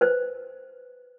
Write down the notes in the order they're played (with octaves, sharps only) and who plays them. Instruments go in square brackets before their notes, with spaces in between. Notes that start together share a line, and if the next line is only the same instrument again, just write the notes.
[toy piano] B4 C5